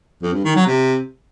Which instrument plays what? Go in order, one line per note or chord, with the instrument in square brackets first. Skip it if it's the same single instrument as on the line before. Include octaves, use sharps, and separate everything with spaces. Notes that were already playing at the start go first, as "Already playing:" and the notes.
[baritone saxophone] F2
G2
D#3
F#3
C3